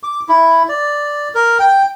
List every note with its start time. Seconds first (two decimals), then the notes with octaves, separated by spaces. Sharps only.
0.03 D6
0.29 E4
0.69 D5
1.35 A#4
1.60 G5